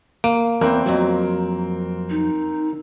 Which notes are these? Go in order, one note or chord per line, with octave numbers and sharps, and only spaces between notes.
A#3 D7
E2 C4 A#4
F2 F#3
D#4